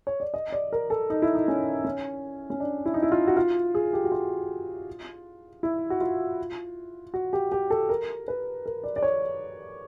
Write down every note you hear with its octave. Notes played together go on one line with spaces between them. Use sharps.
C#5
D5
D#5
D5
A#4
A4
D#4
E4
D#4
C#4
C#4
C#4
D4
E4
D#4
E4
F4
F#4
F4
G#4
G4
F#4
F4
E4
F#4
F4
F#4
G4
G4
A4
A#4
B4
A#4
D5
D5
C#5